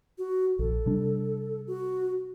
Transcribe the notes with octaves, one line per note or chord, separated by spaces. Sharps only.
F#4
A#1 A4
C3 G3 D4
F#4